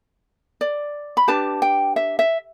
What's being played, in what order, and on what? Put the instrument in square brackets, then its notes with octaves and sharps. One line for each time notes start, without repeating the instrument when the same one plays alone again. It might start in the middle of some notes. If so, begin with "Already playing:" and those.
[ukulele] D5
B5
D4 G4 B4 A5
G5
E5
E5